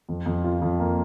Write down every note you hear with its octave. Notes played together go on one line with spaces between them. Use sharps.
F2
F2
F4
F2
A#3